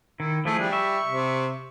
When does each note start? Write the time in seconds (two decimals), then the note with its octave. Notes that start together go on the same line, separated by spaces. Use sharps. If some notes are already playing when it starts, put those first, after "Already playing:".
0.20 D#3 E4
0.45 F3 A3 E4 G#4 A4
0.59 G3 D4
0.73 E5 C#6
1.06 C3